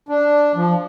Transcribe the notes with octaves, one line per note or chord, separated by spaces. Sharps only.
D4
F3